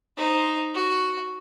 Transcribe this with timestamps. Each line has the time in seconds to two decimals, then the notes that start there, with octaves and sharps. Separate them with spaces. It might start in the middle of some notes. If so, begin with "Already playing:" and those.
0.17 D#4 C5
0.74 F#4